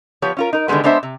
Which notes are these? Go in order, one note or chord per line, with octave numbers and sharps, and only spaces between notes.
F3 B3 G4 C#5
C#4 F4 A#4
D#4 A#4
D3 D#3 G3 G#3 B3
G#3 B3 D4 C5 E5
C3